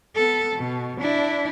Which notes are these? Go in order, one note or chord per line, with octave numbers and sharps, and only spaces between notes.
B3 A4
B2
D4 E4